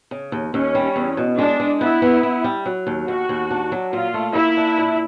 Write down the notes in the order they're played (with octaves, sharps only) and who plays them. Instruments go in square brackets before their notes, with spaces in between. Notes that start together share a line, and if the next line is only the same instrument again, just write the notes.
[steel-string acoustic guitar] C#3
D#2
[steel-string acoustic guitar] D#2 [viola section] C#4
[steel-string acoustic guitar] G3
E2
B2
[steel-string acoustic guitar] G#3 [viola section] D4
[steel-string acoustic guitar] G#3
[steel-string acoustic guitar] B3 [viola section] E4
[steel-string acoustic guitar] B3
B3
G3
F#3
D#2
[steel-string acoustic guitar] D#2 [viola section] F#4
[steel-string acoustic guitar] D#2
D4
F#3
[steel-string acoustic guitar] A#2 [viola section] F4
[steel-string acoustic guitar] A3
[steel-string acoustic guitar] A#3 [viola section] E4
[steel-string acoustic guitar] D4
A#2